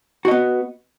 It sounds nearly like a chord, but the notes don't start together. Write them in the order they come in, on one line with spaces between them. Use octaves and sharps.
F#4 D#5 B3